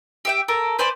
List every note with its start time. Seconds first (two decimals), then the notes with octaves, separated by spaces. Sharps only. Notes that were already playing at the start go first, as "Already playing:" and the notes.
0.25 G4 E5 G5
0.48 A4 A#4
0.79 B4 C5 D5 G#5